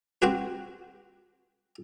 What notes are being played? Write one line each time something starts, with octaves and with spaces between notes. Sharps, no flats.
C4 F#4 G4 B4